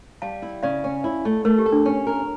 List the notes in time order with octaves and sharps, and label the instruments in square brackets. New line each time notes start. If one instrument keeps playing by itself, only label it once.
[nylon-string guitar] G3 [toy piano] F5 A5
[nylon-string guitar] E4
[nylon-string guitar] C#3 [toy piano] D5 F5
[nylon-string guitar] C#4
E4
A3
[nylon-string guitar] A3 [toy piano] A#4
[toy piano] G4
[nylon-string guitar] A4
[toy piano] D4
[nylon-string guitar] C#4
A#4